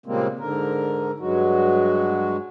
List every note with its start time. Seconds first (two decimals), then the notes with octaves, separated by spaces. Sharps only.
0.06 A#2 C#3 G3 G#3 A#3 C4
0.39 G#2 D3 A#4
1.20 G2 F#3 G#3 F#4